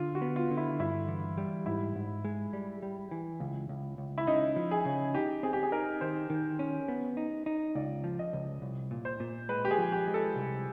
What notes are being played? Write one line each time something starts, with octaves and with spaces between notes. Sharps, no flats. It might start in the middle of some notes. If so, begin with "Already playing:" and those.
Already playing: D3 F4
F#4
B3
F4
D3
E4
G2 E4
E3
G3
G#2 E4
G#2
G#3
G3
G3
E3
C#2
C#2
C#2
E4
C#3 D#4
F3
G#4
C#3
D#4 G4
C4 G#4
G4
G#4
D#4 A#4
D#3 C5
D#3
C#4
B3
D#4
D#4
C#2 D5
F3
D#5
C#2
C2
A#2
C5
A#2
G#3 B4
G4
G#4
F3
G4
G#3
A4
C2